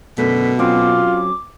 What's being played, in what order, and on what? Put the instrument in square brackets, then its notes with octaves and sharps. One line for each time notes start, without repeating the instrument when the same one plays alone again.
[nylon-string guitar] F#2 D3 A3 [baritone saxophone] B2 [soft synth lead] B6
[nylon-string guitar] F#3 C4 C#4 [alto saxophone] F4 [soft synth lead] D6